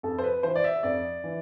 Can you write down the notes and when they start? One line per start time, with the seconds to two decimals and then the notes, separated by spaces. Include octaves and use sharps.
0.03 F2 A4
0.19 C5
0.23 B4
0.43 E3 C5
0.56 D5
0.64 E5
0.83 F2 D5
1.24 E3